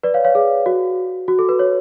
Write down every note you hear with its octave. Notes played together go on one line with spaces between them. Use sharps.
B4 D5
C#5 F5
C#5 F5
G#4
F#4
F#4
A4
B4
C#5